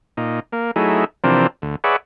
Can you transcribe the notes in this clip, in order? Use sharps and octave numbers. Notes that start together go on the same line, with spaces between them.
A#2 D#4
A#3
F#3 A3 D#4 E4 G#4
C3 E3 F3 C4 D4 A#4
D2
G#4 B4 C#5 D5 E5 F#5